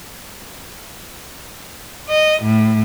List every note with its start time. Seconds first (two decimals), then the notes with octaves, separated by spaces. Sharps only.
2.09 D#5
2.43 A2